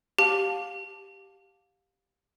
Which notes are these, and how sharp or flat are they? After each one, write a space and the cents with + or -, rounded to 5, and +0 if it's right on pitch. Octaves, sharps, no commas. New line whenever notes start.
G4 +0 F5 +25 A5 +0